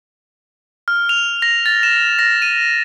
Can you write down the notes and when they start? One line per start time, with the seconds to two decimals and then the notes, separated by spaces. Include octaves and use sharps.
0.88 F6
1.09 F7
1.42 A#6
1.66 A6
1.83 E7
2.19 A#6
2.42 D#7